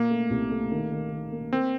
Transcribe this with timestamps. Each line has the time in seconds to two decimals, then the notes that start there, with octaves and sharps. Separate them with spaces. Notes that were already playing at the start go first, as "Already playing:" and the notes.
Already playing: A#2 A#3
0.10 A3
0.30 C2
0.51 A3
0.71 D#3
0.91 D#3
1.11 D#3
1.32 A#3
1.52 A#3 C4